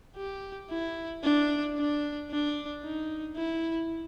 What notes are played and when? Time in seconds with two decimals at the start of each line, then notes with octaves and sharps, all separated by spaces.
0.17 G4
0.70 E4
1.24 D4
1.77 D4
2.31 D4
2.84 D#4
3.37 E4